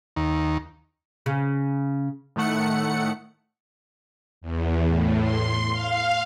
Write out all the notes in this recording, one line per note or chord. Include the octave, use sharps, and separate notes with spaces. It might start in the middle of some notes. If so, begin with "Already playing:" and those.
D#2
C#3
A2 D#3 A3 F#5 C#7
E2
A2
C6
F5